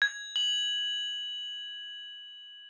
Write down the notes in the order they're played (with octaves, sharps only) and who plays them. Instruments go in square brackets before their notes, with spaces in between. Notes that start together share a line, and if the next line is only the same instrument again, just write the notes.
[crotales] G#6
F#7